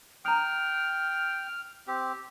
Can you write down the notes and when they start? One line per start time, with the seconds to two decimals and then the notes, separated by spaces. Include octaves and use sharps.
0.25 G5 A#5 D#6 F6
1.87 C4 G4